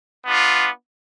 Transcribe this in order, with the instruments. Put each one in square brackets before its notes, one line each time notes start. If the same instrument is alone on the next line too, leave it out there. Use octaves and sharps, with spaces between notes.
[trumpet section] B3 D4 F4